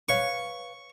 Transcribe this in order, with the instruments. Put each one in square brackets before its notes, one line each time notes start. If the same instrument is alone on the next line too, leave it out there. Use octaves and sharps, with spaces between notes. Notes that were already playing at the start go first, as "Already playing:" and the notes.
[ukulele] B4 C#5 F5 [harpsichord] C#6